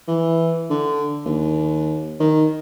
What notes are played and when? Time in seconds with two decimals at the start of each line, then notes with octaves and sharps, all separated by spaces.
0.08 E3
0.70 D3
1.25 D#2
2.20 D#3